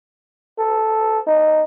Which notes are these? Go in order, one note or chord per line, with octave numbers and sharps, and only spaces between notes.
A4
D#4